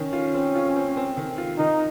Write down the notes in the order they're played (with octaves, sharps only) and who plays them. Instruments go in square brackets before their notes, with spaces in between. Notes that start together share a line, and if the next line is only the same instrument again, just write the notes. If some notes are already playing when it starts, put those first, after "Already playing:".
Already playing: [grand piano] D#3 [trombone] C#4
[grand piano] F4
C4
F4
C4
C4
D#3
F4
[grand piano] D#3 [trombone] D#4